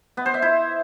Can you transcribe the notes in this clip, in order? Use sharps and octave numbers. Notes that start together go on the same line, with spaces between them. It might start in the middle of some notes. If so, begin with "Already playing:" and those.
B3
C5
E5
E4